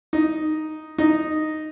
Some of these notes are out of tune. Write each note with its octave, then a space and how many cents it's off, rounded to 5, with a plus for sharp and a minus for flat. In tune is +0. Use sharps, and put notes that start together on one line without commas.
D#4 +0
D#4 -5